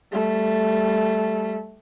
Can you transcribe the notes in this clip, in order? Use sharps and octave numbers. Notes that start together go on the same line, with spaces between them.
G3 A3